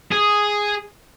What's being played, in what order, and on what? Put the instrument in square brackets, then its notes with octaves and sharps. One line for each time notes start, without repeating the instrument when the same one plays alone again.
[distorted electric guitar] G#4